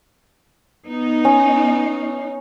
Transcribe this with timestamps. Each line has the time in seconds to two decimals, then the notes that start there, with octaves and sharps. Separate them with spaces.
0.86 B3 D#4
1.25 C#4